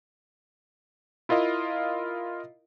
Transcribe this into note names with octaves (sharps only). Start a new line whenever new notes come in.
E4 F4 A#4 D#5 F5